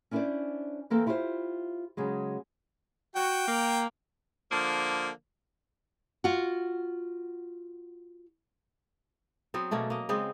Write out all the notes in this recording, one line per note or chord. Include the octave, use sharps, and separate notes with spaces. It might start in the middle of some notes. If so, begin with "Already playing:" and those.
C#4 D4 E4 A4 C5 D5
E3 A#3 C4 A4
E4 F4 G4 A#4 C5
C#3 F#3 G#3
F#4 G5
A#3
D3 F3 A#3
F4 F#4
F#3 B3 C4
B2 A3 A#3 C#4
A#3 D#5
C#3 G#3 B3 C4